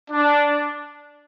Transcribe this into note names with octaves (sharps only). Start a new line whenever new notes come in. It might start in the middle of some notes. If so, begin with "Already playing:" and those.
D4